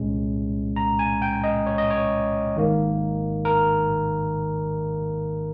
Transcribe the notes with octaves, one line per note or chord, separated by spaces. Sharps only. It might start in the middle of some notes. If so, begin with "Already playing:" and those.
Already playing: C2 A#2 G#3 C#4
A#5
G#5
G5
D#5
C#5
D#5
C#5
G#1 G#2 D#3 A#3
A#4